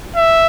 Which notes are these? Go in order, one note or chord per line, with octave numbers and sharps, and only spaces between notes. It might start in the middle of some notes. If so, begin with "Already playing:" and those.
E5